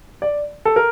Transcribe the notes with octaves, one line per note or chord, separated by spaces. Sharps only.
D5
A4
A#4